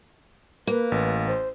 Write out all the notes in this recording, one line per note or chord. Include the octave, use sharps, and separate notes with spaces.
A#3 B4
A1
C5